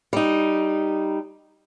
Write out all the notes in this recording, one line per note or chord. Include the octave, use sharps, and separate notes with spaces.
G3 D#4